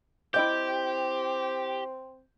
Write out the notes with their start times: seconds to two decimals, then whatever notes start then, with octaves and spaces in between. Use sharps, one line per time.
0.34 C4 E4 G4 D#5 G5 G6